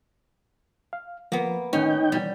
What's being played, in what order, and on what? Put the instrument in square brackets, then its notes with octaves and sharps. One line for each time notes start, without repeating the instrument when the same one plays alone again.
[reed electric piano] F5
[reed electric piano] F3 [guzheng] A#3 B3
[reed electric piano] A2 D#3 [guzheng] C#4 [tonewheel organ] D#4 G5
[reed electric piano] B2 E3 [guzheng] G3